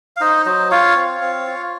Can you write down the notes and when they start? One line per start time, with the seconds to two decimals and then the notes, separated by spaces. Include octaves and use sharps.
0.16 F5
0.21 D#4 C5 D#5
0.46 F#3 C5 D#5
0.71 F4 C#5 F5
0.96 C4
1.21 C4
1.47 F4